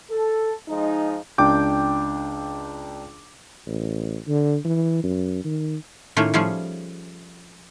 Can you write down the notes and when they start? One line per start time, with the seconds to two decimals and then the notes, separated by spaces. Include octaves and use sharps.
0.10 A4
0.69 F3 G#3 D#4
1.38 C#2 D4 G5 D6 G6
3.67 A1
4.28 D3
4.65 E3
5.04 F#2
5.45 D#3
6.16 A2 D#3 A3 A#3 C#4 F4
6.34 F3 G3 A3 C#4 F4 G#4